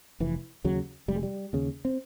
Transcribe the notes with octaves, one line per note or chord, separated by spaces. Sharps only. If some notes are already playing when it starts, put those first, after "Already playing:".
F1 E3
D#2 C#3 F#3
F1 G3
G#3
G3
D#2 C#3
C4